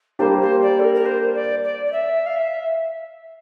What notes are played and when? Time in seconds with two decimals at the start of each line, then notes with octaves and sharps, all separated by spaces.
0.19 G3 A#3 D4 G4 C5
0.41 C5
0.62 D5
0.79 A4
0.84 A#4
0.95 A#4
1.06 C5
1.35 D5
1.64 D5
1.86 D5
1.92 E5
2.26 F5
2.36 E5